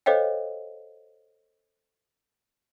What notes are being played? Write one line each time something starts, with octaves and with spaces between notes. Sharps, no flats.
A4 C5 C#5 D#5 F5 G5